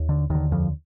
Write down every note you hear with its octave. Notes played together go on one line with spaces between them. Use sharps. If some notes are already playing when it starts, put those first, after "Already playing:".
Already playing: D#2
D3
D#2 D3 D#3
F2 F3